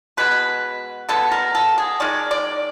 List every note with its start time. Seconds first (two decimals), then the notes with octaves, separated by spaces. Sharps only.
0.17 B2 G#3 B3 B4
1.09 B2 G#3 B3 A4
1.32 A#4
1.55 A4
1.78 G#4
2.00 D#3 G#3 D5
2.31 D5